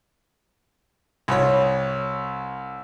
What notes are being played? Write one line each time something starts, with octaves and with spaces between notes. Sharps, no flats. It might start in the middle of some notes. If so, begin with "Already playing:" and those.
C2 C#5